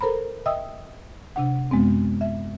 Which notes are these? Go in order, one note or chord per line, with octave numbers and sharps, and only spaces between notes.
A4 A#4 C5 A#5 B5
D#5 E5 G5 D#6 E6
C3 D4 F#5
F#2 G#3 B3 C4
E5